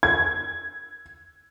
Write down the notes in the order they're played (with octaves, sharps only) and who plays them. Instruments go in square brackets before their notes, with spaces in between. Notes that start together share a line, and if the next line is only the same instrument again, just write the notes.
[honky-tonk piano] G#6